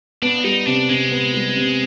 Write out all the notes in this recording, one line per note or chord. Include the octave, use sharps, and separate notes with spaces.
B3 D4
G3 D#4
C3 D4
C3 G#3
B3
G3
C3